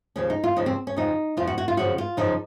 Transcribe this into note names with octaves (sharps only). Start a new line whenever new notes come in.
D#2 C#3 F3 C#4
D#4
F4
D#2 C#3 F3 D#4
C4
C#4
F2 C#3 F3 D#4
F2 C#3 F3 F4
F#4
F#4
F4
F#2 C#3 F3 F#4
F4
F#2 C#3 F3 D#4